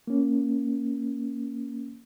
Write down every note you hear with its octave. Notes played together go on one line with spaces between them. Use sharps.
A#3 C#4